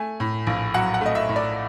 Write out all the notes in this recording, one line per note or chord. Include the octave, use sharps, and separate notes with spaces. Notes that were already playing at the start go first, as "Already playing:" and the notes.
Already playing: A3 G#5
A2
A#1
F#3 F#5
F#5
A3 D#5
E5
A2
D5